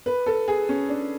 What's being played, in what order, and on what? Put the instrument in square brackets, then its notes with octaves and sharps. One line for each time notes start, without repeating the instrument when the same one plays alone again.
[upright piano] B4
A4
G#4
C#4
D4